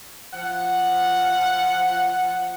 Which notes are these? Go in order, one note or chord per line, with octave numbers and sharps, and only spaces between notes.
F3 F#5